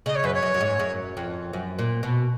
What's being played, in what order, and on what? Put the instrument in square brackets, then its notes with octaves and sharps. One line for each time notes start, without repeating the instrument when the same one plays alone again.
[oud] C#3 [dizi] D#5
[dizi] C#5
[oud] F#2 [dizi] B4
[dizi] C#5
[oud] F#2
F#2
G#2
F#2
F2
F#2
A#2
B2